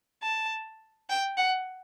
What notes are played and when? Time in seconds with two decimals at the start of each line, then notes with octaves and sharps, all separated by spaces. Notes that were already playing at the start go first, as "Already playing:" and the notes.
0.22 A5
1.09 G5
1.37 F#5